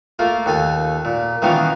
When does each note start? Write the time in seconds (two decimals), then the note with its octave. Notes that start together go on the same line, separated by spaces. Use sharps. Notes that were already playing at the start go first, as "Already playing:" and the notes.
0.19 A3 A#3 F4
0.46 D#2 A4 G#5
1.05 A#2
1.42 D#3 E3 A#3 B3 C#4 F4